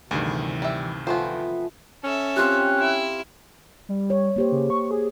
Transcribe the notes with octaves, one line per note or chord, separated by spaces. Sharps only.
D2 G2 C3 D#3 E3 G#4
G3 E5
F3 A3 B3 C4 C5 G#5
C#4 A4 E5
C4 F4 G4 F#6
E4 E5
G3
C#5
A#3 G4 C5
C#3
C#6
G#4